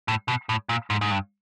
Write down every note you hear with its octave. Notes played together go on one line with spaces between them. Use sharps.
A2
B2
A2
A#2
G#2
G#2
G2